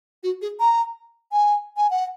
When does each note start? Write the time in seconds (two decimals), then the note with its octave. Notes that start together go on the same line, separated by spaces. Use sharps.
0.23 F#4
0.42 G#4
0.60 A#5
1.32 G#5
1.77 G#5
1.90 F#5